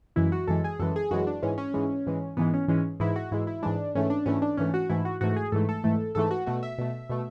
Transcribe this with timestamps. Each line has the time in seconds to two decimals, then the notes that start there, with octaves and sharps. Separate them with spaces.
0.16 F#2 E3 G#3 E4
0.32 F#4
0.47 F#2 E3 G#3 A4
0.64 G#4
0.79 F#2 E3 G#3 A4
0.96 G#4
1.11 F#2 E3 G#3 F#4
1.27 D4
1.43 G#2 E3 G#3 C#4
1.58 C#4
1.74 G#2 E3 G#3
2.06 G#2 E3 G#3
2.37 G#2 E3 G#3 B3
2.54 C#4
2.68 G#2 E3 G#3 C#4
3.00 G#2 E3 G#3 E4
3.16 F#4
3.31 G#2 E3 G#3 E4
3.47 E4
3.63 G#2 E3 G#3 D4
3.95 G#2 E3 A3 C#4
4.10 D4
4.26 G#2 E3 A3 C#4
4.42 D4
4.57 G#2 E3 A3 C#4
4.74 F#4
4.90 G#2 E3 A3 E4
5.05 F#4
5.21 G#2 E3 A3 F#4
5.36 G#4
5.52 G#2 E3 A3 A4
5.69 A4
5.84 G#2 E3 A3
6.15 G#2 E3 A3 A4
6.31 F#4
6.46 B2 A3 F#4
6.63 E5
6.78 B2 A3
7.10 B2 A3